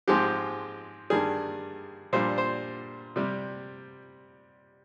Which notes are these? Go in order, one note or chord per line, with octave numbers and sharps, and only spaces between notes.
G#2 F3 G#3 C4 G4
G2 D#3 G3 G#4
A#2 G3 D4 C5
C5
C3 G3